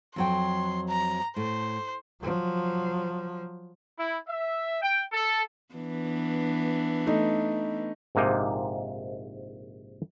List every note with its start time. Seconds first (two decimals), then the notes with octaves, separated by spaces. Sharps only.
0.16 F2 F#3 G5 C6
0.89 A#5
1.36 A2 C5
2.21 F3 F#3
3.98 E4
4.27 E5
4.82 G5
5.12 A4
5.74 E3 B3 D4
7.07 A3 D#4
8.15 A#1 G#2 C3 A#3 D#4